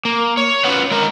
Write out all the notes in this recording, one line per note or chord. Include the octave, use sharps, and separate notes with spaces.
A#3
C#5
C#4 F4 F#4 B4 F#5
G#3 A#4 D#5